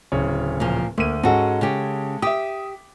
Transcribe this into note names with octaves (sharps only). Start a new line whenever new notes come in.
D1 C#3 C#5
A#2 F3
D2 A#3 D#7
G#2 G#3 C#4 F#4 A4
C#3 G4
G4 E5 D#6